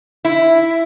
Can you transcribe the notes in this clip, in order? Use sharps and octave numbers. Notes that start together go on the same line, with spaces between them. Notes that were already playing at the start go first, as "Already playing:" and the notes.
E4